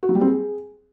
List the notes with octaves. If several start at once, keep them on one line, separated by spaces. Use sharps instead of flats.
F#4
F#3
G3
C4
G#4